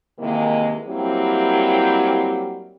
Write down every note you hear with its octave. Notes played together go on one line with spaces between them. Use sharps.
C3 D#3 E3 G#3 A#3
F#3 G3 A#3 C4 E4 G4